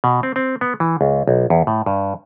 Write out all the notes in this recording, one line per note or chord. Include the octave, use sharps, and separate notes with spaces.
B2
C4
C4
B3
E3
C#2
B1
E2
A2
G2